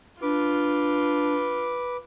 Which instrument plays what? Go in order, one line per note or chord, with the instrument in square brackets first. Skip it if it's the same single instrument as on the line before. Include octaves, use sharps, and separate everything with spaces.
[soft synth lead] D4 [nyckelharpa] F4 [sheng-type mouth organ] B4 D6